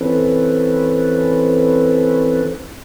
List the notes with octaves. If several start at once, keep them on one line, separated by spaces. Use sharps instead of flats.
E3 C4 C#4 A4 B4